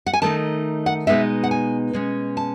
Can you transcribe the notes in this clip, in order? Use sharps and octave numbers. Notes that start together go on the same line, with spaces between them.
F#5
G#5
D#3 A3 D#4 A5
F#5
B2 G#3 B3 D#4 E5
F#5
G#5
B2 G#3 C#4
A5